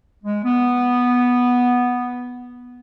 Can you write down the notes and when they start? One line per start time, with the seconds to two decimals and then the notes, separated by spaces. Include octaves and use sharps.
0.24 G#3
0.44 B3